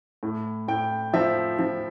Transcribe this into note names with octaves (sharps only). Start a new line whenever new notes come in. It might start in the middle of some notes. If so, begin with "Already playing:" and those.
A2
A2 G5
F3 E5
F3